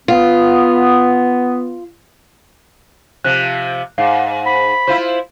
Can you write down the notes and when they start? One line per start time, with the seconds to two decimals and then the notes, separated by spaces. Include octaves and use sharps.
0.08 B3 F4
3.24 C3 F3 F#6
3.98 G#2 F5
4.46 B5
4.87 E4 F4 C5